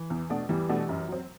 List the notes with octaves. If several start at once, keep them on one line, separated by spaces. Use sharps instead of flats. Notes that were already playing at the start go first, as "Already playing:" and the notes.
Already playing: E3
E2
B2 A3 D4 F#4
E2 E3 G3
B2 A3 D4 F#4
F#2
F#3 C4